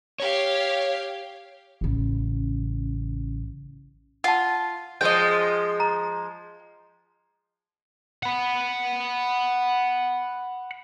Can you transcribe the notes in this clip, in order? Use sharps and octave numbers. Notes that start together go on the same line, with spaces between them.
G4 C#5 F5
A1 C#3
F4 F#5 A5
F3 G#3 D#5 G5
A#5
F#5 B5